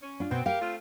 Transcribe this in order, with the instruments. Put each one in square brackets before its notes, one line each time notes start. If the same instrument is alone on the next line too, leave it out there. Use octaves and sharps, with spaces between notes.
[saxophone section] C#4
[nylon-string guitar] D4 F4
[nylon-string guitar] B2 [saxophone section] C4
[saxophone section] G4 A#4 [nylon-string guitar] F5
[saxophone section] A3 C4 F4